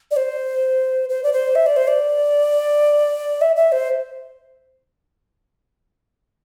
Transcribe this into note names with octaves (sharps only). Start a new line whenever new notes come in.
D5
C5
C5
D5
C5
E5
D5
C5
D5
E5
E5
C5